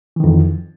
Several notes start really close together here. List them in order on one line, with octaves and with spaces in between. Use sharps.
E3 D#3 F2